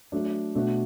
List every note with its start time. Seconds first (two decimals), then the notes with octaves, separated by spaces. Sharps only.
0.12 F#3 A3 D4
0.55 B2 A3 D4 F#4